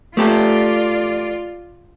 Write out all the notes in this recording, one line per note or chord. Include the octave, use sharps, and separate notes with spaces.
A3 F4 G4 A4 D5